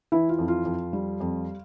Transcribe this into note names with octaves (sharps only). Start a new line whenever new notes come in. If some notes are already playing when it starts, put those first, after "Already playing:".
E3 E4
F4
F2
F4
F2
G3
F2